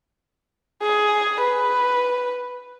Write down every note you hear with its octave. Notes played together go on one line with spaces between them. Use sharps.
G#4
B4